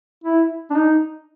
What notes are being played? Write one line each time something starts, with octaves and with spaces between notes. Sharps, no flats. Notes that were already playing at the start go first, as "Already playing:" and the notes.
E4
D4
D#4